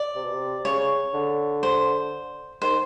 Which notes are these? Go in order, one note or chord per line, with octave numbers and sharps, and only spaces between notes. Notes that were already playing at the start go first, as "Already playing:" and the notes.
Already playing: D5
C3
B2
C3
C#3 C#5
D3
C5
D#3 C5